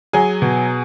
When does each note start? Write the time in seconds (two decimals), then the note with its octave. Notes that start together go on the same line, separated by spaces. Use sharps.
0.13 F#3 G#4 G#5
0.42 B2